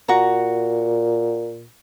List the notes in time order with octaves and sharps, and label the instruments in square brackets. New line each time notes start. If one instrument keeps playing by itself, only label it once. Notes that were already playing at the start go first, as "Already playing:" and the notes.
[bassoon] A#2 [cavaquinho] F#4 A#5